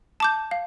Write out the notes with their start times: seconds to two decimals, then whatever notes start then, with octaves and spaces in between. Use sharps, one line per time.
0.20 A5 D6 G6
0.51 F5